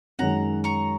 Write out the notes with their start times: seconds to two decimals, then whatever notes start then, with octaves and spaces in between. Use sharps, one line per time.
0.19 F#2 D#3 G#3 F#5 A#5
0.64 A#5 C#6